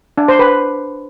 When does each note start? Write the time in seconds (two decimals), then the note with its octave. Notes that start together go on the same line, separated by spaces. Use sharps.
0.18 D4
0.28 C5
0.39 B4